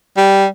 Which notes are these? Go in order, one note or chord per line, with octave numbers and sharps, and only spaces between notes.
G3